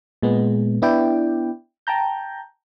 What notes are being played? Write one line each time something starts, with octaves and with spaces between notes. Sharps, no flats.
A#2 G#3 B3
B3 D4 E4 D5 G5
G5 A5 A#5 G6